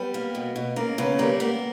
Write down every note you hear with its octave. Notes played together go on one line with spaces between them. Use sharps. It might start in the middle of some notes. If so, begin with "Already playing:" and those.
Already playing: G3 B3
A#3
B2
B2
C#3 A#3
C#3 B3
G3 A#3
A#3 B3